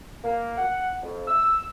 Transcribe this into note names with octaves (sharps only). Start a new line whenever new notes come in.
A#3
F#5
F2
E6